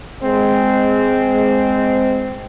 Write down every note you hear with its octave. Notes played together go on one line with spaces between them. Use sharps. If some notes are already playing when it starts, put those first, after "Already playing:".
G#3 C4